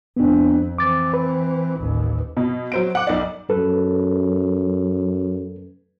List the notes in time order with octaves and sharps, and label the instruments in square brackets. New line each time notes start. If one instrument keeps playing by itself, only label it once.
[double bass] F2 [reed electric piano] B3 D4
[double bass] E3 C4 [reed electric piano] D6 A6
[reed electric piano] B4
[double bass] A1 D#2
[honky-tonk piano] B2
F#3 C5 D7
F#5 D6
B1 D5
[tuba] F#2 [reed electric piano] A4 B4